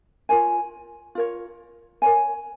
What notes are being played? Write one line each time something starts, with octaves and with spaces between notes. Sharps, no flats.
F4 A#4 C#5 G#5
F4 A#4 C#5
A#4 C#5 G#5